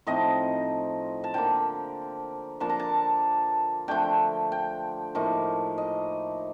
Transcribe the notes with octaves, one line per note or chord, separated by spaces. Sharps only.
A2 F3 C4 D#4 D#5
A5
D3 F3 A#3 G5
F3 A#3 D4 F4 A5
A#5
A5
D3 F3 A3 D4 G5
G5
A2 F3 A#3 D#4
D#5